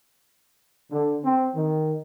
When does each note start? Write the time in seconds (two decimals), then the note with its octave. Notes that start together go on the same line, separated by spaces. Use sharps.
0.91 D3
1.24 C4
1.55 D#3